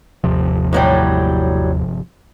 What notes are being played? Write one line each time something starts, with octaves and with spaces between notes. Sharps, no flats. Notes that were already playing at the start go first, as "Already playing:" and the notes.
G1 D#2 C3 F3
A2 F#3 G3